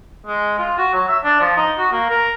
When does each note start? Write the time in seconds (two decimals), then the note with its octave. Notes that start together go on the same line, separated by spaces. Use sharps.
0.26 G#3
0.59 F4
0.78 F#4
0.93 F#3
1.09 E5
1.24 D4
1.41 F3
1.57 D#4
1.79 F#4
1.92 A#3
2.10 A#4